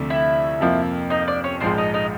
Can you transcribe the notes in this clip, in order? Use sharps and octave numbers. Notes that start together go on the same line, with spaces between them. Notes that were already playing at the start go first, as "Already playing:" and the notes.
Already playing: D2 C3 F3 A3 D4
E4 E5
F2 C3 F3 A#3
D#4 D#5
D4 D5
C#4 C#5
A#1 G#2 F3 G#3 C4 C5
D#4 D#5
D#4 D#5